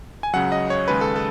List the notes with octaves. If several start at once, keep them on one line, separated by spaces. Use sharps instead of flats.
G#5
C#2 C#3 F#3 F#5
D#5
C#5
D#2 C#3 G#3 B4
A4
A4